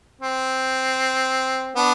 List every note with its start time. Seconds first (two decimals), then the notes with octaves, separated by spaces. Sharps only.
0.21 C4
1.76 B3 D4